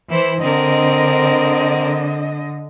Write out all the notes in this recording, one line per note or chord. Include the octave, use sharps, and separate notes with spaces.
E3 E4 C5
D3 C4 A#4 D#5